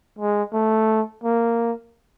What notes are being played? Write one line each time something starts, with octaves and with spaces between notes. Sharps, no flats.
G#3
A3
A#3